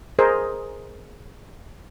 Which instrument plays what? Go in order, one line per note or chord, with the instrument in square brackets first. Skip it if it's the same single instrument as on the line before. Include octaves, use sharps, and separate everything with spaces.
[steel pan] G#4 A#4 C5 D#5